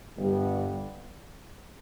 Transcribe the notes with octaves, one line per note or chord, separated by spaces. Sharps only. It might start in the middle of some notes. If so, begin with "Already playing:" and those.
G1 G2 G3 B3 G4